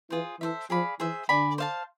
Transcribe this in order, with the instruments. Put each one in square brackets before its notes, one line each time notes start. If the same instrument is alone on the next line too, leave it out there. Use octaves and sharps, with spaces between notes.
[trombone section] E3 [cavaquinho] F4 G#4 C5
[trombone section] E3 [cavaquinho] A4 C5 E5
[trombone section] F3 [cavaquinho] G#4 D5 F5 B5
[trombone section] E3 [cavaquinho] G#4 C5 E5
[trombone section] D3 [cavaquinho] D5 G#5 B5
[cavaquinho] C5 F5 A5